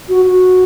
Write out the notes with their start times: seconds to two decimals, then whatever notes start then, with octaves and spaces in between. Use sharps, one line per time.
0.09 F#4
0.26 F#4